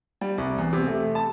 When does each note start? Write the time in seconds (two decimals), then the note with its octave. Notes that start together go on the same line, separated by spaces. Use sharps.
0.21 G3
0.38 C2
0.58 E2
0.73 C3
0.87 A3
1.15 A5